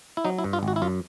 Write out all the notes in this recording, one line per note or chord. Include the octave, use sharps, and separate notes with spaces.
E4
F#3 D#4
E4
G2
F4
G#1 F#4
E4
F#2 F4